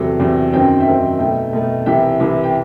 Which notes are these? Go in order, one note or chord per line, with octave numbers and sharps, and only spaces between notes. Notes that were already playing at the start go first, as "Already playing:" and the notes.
Already playing: E2 C3 F#3 F#4 A4
E2 C3 F#3
F#2 D#3 F#3 C4 G5
E5 G5
F#2 D#3 F#3 C4
B2 A3 D#4 E5 G5
B2 A3 D#4
C2 C3 E3 E5 G5
C2 C3 E3
G5